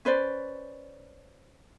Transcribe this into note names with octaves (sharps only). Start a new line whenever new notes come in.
C#4 B4 C5 D5